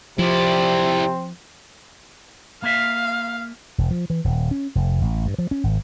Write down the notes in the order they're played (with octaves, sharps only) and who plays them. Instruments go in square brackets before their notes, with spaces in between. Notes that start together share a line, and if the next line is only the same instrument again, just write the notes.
[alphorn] C3 [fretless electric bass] F3 [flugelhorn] C4 [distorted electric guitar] E4 D5
[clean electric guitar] A#3 E5 [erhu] F5
[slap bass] E1
F3
E3
D#1
C#4
F1
A1
G2
F3
C#4
G#1